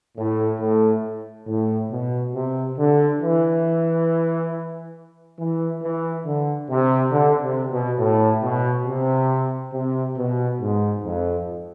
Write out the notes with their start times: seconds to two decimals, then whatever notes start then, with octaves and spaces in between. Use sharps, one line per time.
0.17 A2
0.60 A2
1.47 A2
1.90 B2
2.34 C3
2.78 D3
3.21 E3
5.38 E3
5.82 E3
6.25 D3
6.69 C3
7.12 D3
7.42 C3
7.70 B2
7.99 A2
8.42 B2
8.86 C3
9.73 C3
10.17 B2
10.60 G#2
11.04 F2